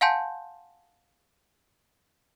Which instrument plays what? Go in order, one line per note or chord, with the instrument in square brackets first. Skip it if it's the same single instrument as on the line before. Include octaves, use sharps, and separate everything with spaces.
[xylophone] F5 F#5 G#5 A5 C6 G6